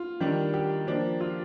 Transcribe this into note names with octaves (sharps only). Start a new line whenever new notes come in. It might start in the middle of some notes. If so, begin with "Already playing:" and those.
Already playing: F4
D#3 G3 D4
G4
F3 A#3 D4
F4